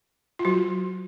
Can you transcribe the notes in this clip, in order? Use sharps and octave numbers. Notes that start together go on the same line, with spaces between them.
F4
F#3 F#4